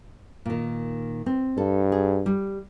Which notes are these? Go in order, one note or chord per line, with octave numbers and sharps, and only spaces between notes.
A#2 D#3
C4
G2 A4
G#4
G3